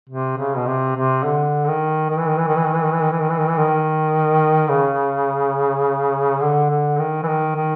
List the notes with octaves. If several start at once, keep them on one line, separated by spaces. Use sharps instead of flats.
C3
C#3
B2
C3
C3
D3
D#3
D#3
E3
D#3
E3
D#3
E3
D#3
E3
D#3
E3
D#3
E3
D#3
E3
D#3
E3
D#3
C#3
D3
D3
D#3
E3
D#3
D#3